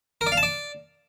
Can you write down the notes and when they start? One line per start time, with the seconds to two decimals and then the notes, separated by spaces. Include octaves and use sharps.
0.21 A#4
0.27 D5
0.32 F5
0.37 A5
0.43 D5